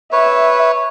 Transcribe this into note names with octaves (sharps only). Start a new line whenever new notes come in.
B4 C#5 E5